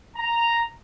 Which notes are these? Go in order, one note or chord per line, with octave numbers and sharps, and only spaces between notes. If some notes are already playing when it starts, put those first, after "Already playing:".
A#5